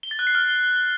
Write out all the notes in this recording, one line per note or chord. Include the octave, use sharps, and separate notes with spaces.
G7
A6
F#6
C7
F6